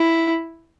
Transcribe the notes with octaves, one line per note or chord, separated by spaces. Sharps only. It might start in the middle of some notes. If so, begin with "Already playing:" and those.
Already playing: E4